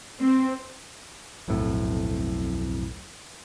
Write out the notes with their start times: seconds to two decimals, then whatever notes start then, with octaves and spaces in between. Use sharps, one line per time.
0.20 C4
1.48 D1 B1 F2 A2